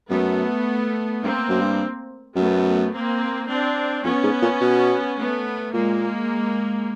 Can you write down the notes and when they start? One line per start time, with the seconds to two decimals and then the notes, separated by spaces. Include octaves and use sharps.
0.10 F#2 A3 B3
1.23 G2 A#3 C4
1.49 F#2
1.61 G2
2.35 F#2 A3 B3
2.93 A#3 C4
3.48 C4 D4
4.04 F2 B3 C#4
4.24 G#2
4.42 A#2
4.61 B2
5.17 A3 B3
5.73 A#2 G#3 A#3